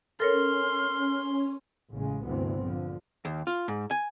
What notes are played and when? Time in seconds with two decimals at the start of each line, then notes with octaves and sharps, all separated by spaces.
0.20 C#4 A4 A#4 C#5 C6 F6
1.92 A1 C#3 G#3
2.24 D2 G2 C3 E3 B3 C4
2.63 A#1 D3 F3
3.25 D#2
3.47 F4
3.68 G#2
3.91 G#5